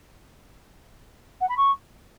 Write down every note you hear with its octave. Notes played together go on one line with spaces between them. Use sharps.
F#5
B5
C#6